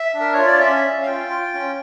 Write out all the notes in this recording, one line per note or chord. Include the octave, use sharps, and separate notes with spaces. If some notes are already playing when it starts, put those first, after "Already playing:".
Already playing: E5
D4
A#4
F4 C#5
D5
C#4 E5
C#4
F5
F4 G5
F4
C#4